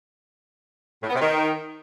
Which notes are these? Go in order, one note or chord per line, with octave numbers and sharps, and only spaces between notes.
A2
B3
C3
D#3